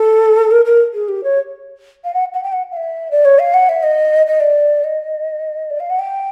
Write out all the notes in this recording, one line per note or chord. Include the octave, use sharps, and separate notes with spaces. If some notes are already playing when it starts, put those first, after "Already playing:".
Already playing: A4
A#4
A#4
G#4
G4
C#5
F5
F#5
F#5
G5
F#5
F5
E5
D5
C#5
F5
F#5
E5
D#5
D#5
D5
D#5
D5
F5
F#5
G5